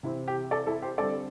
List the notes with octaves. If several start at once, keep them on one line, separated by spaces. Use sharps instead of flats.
C3 E3 C4 E4
G4
A4 D5
E4 A4
G4 C5
D3 G3 C4 A4 D5